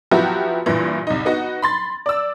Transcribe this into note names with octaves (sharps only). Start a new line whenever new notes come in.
F3 F#3 B3 E4 F#4 G4
G2 A#2 E3
C2 D#4
B3 D#4 F#4
B5 C6 A6
D5 E6